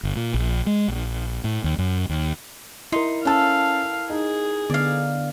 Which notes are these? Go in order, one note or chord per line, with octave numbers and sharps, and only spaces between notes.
G1
A#2
A#1
G#3
A#1
A2
D#2
F#2
D#2
D#4 E4 A#4 C6
C#4 A4 B4 F5 A5
D#4 G#4
D3 B3 D5 F5